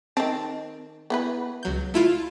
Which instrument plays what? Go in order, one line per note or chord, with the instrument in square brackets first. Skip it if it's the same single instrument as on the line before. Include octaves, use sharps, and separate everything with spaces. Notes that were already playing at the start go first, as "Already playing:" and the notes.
[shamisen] D#3 A5 [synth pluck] C4
[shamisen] B3 E4 B4
[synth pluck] C#2 F#3 G6
A3 E4 F4